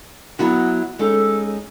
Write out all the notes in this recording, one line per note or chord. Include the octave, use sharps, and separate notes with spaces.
F#3 B3 E4 F#4
G#3 C#4 D#4 A4